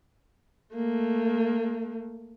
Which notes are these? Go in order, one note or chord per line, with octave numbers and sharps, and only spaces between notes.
A3 A#3